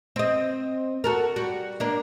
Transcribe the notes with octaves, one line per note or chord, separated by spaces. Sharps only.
C4 D#5
F#4 A4 A#4
G3 F#4
A#3 D4